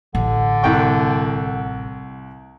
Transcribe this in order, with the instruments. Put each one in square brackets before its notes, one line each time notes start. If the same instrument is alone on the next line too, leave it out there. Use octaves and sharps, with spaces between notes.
[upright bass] A1 [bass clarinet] D3
[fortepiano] C2 G5 C#6